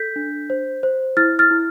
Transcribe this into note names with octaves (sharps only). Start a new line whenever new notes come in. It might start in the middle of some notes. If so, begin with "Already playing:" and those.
Already playing: A4 G6 B6
D4
C5
C5
E4 F6 A6
F6 A6
E4